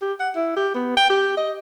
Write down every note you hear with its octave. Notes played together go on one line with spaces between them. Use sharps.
G4
F#5
E4
G4
B3
G5
G4
D#5